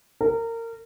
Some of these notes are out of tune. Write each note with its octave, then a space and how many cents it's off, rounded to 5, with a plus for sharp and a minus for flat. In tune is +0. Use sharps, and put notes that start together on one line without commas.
A#4 -25